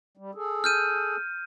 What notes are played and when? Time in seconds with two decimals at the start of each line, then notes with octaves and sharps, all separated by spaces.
0.17 G3
0.35 G#4 A4
0.64 F6 G6 D#7